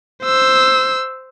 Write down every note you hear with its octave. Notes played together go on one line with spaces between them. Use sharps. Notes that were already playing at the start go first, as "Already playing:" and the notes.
C5 E6